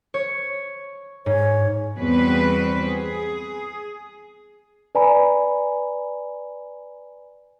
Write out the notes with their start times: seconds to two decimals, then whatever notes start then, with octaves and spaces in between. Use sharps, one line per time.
0.14 C#5
1.26 G#2 C#5
1.98 E2 G3 C4 F#4 B4
2.87 G#4
4.95 B4 D5 G#5 A#5 B5